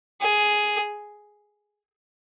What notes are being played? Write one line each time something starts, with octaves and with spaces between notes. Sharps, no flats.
G#4